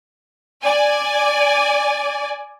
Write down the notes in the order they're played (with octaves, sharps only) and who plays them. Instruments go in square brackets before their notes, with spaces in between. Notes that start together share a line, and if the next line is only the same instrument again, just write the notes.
[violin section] D5 G#5